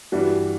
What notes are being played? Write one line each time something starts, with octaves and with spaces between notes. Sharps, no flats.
G2 E3 G3 D4 F#4